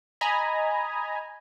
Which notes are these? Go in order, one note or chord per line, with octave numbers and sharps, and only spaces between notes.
D#5 G#5 A#5 B5